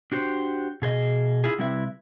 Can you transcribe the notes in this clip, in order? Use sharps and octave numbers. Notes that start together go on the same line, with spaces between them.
D4 F#4 G4 C5
B2 G#4 C5 D#5
E4 F4 G#4
C3 G3 C4 E4 B4 E5